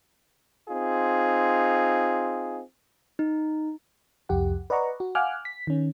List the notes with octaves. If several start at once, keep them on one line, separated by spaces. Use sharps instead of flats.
C4 D#4 F4 G#4
D#4
C2 F2 G4 F#5
B4 D5 D#5 F#5 A#5 C#6
F#4
F5 F#5 G#5 D6 F6 F#6
B6
D#3 C#4